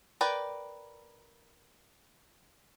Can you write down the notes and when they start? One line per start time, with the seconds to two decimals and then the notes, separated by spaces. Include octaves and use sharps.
0.21 A#4 B4 D5 G5